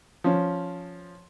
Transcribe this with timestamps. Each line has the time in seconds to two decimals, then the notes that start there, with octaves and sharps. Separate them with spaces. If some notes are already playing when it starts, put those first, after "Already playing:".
0.24 F3 C#4